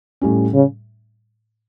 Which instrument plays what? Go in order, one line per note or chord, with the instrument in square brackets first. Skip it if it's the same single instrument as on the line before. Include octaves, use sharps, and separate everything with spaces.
[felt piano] A2 G3 C#4
[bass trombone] C#3